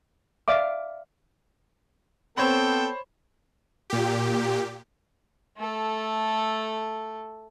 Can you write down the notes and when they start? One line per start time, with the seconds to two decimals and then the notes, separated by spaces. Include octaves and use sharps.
0.48 D5 E5 F5 D6
2.37 B3 C4 A4 C5 C#5 G5 B5
3.90 A#2 G4
5.57 A3 A4